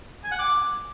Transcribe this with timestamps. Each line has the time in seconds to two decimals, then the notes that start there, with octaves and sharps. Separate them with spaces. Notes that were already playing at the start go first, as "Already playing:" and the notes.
0.24 G#5
0.31 F#5
0.39 D6